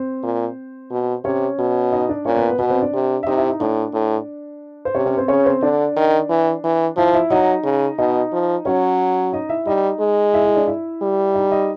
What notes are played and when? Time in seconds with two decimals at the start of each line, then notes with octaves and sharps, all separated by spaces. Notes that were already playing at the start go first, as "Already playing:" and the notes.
Already playing: C4 C5
0.23 A#2
0.91 B2
1.24 C3 C#4 C#5
1.59 B2
1.92 D#4 D#5
2.09 D4 D5
2.25 A#2 C#4 C#5
2.36 B3 B4
2.48 B3 B4
2.59 B2 B3 B4
2.70 C4 C5
2.81 D4 D5
2.94 C3
3.23 E5
3.27 C3 D#4 D#5
3.37 E4 E5
3.50 D#4 D#5
3.60 A2 D4 D5
3.93 A2
4.85 C5
4.95 C3 C#4 C#5
5.06 C#4 C#5
5.17 C4 C5
5.28 C#3 C#4 C#5
5.46 C4 C5
5.62 D3 D4 D5
5.96 D#3
6.30 E3
6.64 E3
6.97 F3 E4 E5
7.14 E4 E5
7.30 F#3 D#4 D#5
7.64 C#3
7.98 B2 D#4 D#5
8.33 F3
8.65 F#3 C#4 C#5
9.33 D#4 D#5
9.49 E4 E5
9.67 G3 D#4 D#5
10.00 G#3
10.34 E4 E5
10.45 E4 E5
10.56 D4 D5
10.67 E4 E5
11.02 G3
11.35 D#4 D#5
11.52 D#4 D#5